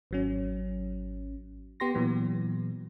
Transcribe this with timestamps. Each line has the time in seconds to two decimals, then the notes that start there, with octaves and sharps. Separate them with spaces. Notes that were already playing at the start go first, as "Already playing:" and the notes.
0.11 G#1 F#3 C#4
1.80 B3 G4 C6 A#6
1.94 A#2 E3 F#3 B3